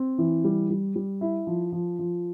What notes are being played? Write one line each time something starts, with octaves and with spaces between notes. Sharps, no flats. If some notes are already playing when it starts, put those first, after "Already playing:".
Already playing: C4
E3
G3
G3
G3
E4
F3
F3
F3